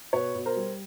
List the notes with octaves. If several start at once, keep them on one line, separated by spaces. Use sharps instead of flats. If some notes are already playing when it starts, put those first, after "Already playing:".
B2 B4 C#5
B2
A#4 C5
G3